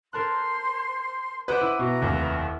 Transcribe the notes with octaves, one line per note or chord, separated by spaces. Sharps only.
A#4 C5 A5 C6 F#6
B4 C5 D#5 F#5 B5 D6
E4
B2 B4 A#5
F1 D#2